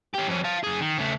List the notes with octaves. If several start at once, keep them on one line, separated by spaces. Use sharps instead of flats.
C#4 G4
F2 C#4
F5 A5
F#2 G#4
D#3
C#3 A3